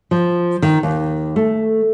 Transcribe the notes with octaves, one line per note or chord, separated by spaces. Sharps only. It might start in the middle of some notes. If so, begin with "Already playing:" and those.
F3
D#3
D#2
A3